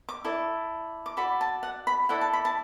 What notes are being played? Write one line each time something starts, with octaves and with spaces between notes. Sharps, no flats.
D6
E4 A4 D5
D6
F#4 A4 D5 B5
A5
F#5
B5
E4 A4 D5 F#5
A5
B5
A5